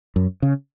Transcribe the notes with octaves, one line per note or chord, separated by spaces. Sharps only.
F#2
C#3